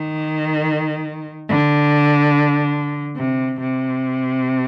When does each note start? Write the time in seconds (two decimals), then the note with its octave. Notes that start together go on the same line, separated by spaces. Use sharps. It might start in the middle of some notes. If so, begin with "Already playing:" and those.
Already playing: D#3
1.48 D3
3.17 C3
3.61 C3